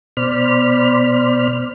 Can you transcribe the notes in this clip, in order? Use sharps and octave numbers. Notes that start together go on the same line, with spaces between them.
B2 C5 D5 B5 F6